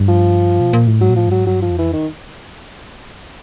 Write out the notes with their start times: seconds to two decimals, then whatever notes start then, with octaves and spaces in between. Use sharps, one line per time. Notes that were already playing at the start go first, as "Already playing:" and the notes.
Already playing: G2
0.08 F3
0.60 B2
0.73 A#2
0.87 A2
1.01 G#2 F#3
1.09 A#2
1.16 A2 F3
1.27 G2
1.31 G#2 F#3
1.47 G2 F#3
1.62 F3
1.70 F2
1.78 E3
1.93 D#3